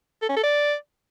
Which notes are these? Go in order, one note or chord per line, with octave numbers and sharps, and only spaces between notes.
A4
C#4
A4
D5